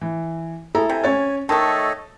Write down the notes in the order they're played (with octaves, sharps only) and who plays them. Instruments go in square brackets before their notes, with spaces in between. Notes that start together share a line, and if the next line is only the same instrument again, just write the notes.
[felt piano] E3
[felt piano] E4 A4 A#5 [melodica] G#4
[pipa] C3 [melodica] G#5
[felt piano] C#4 C#5 A6
[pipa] D#3 A3 [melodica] A4 C#5 D#5 [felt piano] A5